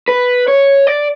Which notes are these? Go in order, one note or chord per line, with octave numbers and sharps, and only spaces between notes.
B4
C#5
D5